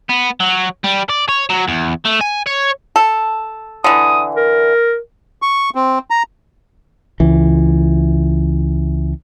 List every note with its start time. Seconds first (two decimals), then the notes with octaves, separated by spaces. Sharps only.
0.10 B3
0.40 F#3
0.84 G3
1.10 D5
1.29 C#5
1.50 F#3
1.68 E2
2.05 A3
2.21 G#5
2.46 C#5
2.96 A4
3.84 D3 E3 D#6
4.37 A#4
5.42 C#6
5.75 C4
6.10 A#5
7.20 C#2 E3